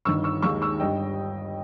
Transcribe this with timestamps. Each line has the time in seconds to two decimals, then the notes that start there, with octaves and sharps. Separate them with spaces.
0.05 G1 G2 D#3 C#6 E6
0.24 C#6 E6
0.42 D#2 D#3 G#3 C#6 E6
0.62 C#6 E6
0.80 G1 G2 G3 D#5 G5